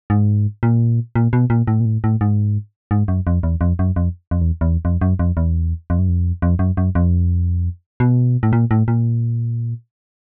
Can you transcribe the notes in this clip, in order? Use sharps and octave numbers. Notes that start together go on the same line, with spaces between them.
G#2
A#2
A#2
B2
A#2
A2
A#2
A2
A2
G#2
G#2
F#2
F2
E2
F2
F#2
F2
F2
E2
E2
F2
F#2
F2
E2
F2
F#2
F2
F2
F#2
F#2
F2
B2
A2
A#2
A2
A#2